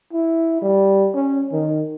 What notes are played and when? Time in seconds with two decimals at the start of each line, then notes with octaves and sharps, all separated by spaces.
0.13 E4
0.62 G3
1.14 C#4
1.53 D#3